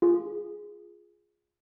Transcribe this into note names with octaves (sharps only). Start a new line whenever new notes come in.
F4 G#4